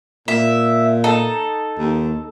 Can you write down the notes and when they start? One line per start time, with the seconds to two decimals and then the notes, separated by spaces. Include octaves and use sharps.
0.28 A#2 E5
1.04 D#4 A4
1.78 D#2